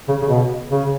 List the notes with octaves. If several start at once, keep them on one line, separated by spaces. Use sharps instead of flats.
C#3
C#3
B2
C#3